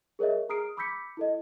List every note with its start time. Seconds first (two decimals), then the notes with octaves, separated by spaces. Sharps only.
0.19 G#4 A#4 C#5 D#5 E5
0.49 G#4 A#5 D#6 F6 C7 D7
0.77 B5 D6 E6 G6 B6 C#7
1.17 E4 A4 D#5